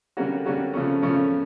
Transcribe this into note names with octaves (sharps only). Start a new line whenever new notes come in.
D3 G3 A#3 C#4 F#4
D3 G3 A#3 C#4 F#4
C#3 F3 A3 C#4
C#3 F3 A3 C#4